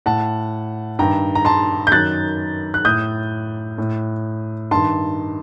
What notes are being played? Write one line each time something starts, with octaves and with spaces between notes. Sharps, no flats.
A2 F#5 A5
G2 D#3 G5 A#5
A#5
A5 C6
G6
F#2 D#3 F#6 A6
F#6
A2 D#6 G6
A2
G2 D#3 A5 C6